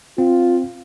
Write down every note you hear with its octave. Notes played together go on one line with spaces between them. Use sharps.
C4 F4